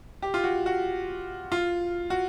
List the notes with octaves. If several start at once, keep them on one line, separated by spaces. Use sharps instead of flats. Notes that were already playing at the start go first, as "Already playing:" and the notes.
G4
F4
F#4
F#4
F4
F#4